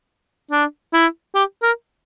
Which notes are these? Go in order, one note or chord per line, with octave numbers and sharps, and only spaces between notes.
D4
E4
G4
A#4